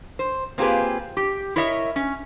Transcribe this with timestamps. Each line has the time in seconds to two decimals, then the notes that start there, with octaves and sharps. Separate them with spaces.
0.19 C5
0.58 A#3 C4 F4 G4 G#4 B4
1.17 G4
1.56 E4 A#4 C#5 D#5 E5
1.96 C#4